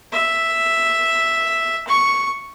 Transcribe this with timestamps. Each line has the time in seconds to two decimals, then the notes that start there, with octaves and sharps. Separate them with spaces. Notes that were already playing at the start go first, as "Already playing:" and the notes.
0.12 E5
1.88 C#6